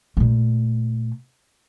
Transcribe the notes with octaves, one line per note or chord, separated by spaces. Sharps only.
A#2 A3